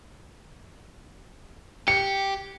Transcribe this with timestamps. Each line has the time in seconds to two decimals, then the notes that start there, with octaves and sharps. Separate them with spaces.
1.88 G4 C#7